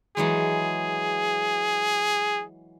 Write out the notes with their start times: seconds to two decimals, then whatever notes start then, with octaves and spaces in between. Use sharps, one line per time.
0.17 E3 F#3 G#3 G#4